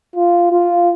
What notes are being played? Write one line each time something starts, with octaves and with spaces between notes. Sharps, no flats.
F4
F4